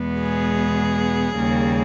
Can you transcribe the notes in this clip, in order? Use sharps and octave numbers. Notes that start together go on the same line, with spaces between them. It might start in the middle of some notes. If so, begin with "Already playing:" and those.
Already playing: E2 B2 G#3 B3
G#4
D#2 C#3 G3 A#3